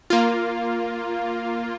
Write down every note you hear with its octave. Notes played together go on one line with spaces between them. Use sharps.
A#3 F4